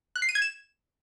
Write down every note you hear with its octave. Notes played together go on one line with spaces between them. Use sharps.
F#6
C7
D#7
G#6
E7